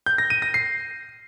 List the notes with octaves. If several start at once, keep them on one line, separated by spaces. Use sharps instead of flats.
G6
A#6
D#7
A#6
C7